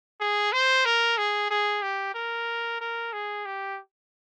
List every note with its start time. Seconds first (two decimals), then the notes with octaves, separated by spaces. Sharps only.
0.20 G#4
0.52 C5
0.85 A#4
1.17 G#4
1.50 G#4
1.82 G4
2.14 A#4
2.81 A#4
3.13 G#4
3.45 G4